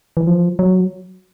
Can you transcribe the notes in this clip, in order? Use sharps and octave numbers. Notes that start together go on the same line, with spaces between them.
E3
F3
F#3